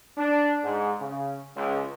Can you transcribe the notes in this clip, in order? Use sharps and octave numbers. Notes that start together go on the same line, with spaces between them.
D4
G#2
C#3
C#2